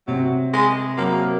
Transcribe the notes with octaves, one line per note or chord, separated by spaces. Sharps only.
C3 F#3
G#3
F#3 A#3